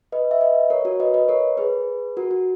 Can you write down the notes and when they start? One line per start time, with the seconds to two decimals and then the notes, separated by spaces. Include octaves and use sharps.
0.12 B4 D#5
0.31 E5
0.41 B4 D#5
0.70 A#4 C#5
0.85 F#4 A#4
1.00 B4 D#5
1.14 B4 D#5
1.28 A#4 C#5
1.58 G#4 B4
2.17 F#4 A#4
2.31 F#4